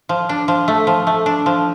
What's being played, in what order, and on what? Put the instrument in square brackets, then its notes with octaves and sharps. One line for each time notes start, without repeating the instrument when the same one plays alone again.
[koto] F3
D4
F3
A3
F3
A3
D4
F3